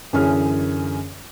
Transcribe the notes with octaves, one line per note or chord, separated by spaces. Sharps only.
F#2 D3 E3 C#4 G#4 F6